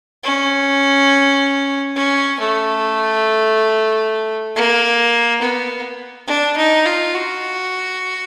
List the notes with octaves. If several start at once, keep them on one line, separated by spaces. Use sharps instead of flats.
C#4
C#4
A3
A#3
B3
D4
D#4
F4
F#4